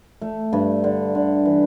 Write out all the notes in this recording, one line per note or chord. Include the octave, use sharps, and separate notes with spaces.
A3
G2
D3
D3
E3